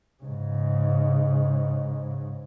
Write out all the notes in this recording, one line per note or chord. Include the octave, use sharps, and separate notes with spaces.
G#2 C#3